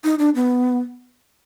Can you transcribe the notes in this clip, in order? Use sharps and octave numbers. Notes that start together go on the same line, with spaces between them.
D#4
D4
B3